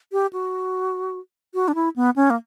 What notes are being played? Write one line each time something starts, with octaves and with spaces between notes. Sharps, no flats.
G4
F#4
F#4
D4
E4
B3
C#4
A#3